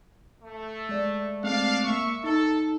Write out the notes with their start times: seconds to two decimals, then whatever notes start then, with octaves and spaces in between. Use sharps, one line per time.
0.42 A3
0.89 G#3 D5
1.44 G#3 A3 C4 D4 F5
1.85 A#3 E5 C#6
2.24 D#4 A4